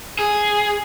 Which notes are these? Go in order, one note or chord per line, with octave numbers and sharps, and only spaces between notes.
G#4